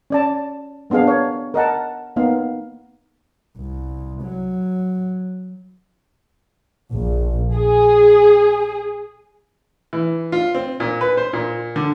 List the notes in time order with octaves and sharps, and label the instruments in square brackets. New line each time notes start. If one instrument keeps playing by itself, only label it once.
[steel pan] C#4 D5 A5
A#3 B3 D4 G#4 F5
B3 A#4 C#5
A#4 D#5 F#5 A5
A#3 B3 D#4 F5
[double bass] C2
F#3
[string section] A#1
G#4
[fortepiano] E3
F4
C4
A#2
B4
C5
A#2
D3